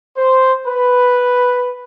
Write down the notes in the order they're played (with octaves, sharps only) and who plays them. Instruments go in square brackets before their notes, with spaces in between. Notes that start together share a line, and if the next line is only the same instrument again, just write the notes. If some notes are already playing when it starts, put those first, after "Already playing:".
[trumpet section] C5
B4